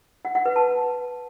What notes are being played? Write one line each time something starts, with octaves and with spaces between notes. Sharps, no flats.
F#5
F#5
B4
A5